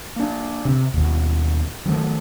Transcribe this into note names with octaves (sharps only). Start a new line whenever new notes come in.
A#3 D4
C3
D#2 B2
D#3 F3 F#3 A3